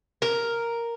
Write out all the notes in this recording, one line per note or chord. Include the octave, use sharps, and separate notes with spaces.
A#4